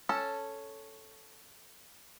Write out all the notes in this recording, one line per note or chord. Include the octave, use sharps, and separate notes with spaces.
C#4 A4 A5